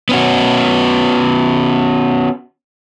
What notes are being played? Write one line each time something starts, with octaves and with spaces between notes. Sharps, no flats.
B3 C#4 F#4